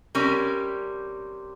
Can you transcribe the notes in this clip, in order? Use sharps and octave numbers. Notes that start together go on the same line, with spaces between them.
C3 G3 C#4 A#4